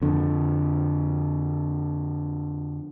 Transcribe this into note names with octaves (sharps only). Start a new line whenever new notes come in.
F2 D3